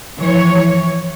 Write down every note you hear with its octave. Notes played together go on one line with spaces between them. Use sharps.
E3 F3 C#5